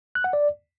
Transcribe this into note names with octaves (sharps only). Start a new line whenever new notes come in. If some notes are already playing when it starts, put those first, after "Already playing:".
F#6
F#5
D5